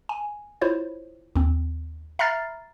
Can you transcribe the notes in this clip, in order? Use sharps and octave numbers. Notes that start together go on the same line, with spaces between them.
G#5
E4 F4 C5 C#5
D#2 C4
E5 A#5 B5 F6 A6 C7